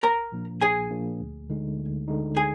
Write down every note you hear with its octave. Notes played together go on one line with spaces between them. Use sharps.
A#1 A#4 A#5
A#2 F3 A#3 D4
A#1 G#4 G#5
A#2 F3 A#3 D4
D2
D3 G#3 D#4
D2
D3 G#3 D#4
G#4 G#5